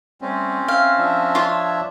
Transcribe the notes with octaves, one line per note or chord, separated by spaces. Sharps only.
G3 A3 C4 C#4
E5 F5
F3 D4 E5
F4 C#5